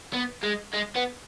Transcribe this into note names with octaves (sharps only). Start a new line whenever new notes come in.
B3
G#3
G#3
B3